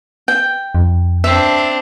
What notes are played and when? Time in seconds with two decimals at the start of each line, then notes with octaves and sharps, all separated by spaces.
0.28 G5
0.75 F2
1.24 C4 D4 E5